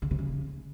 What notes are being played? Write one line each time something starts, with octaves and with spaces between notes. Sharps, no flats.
C#3
C3
C#3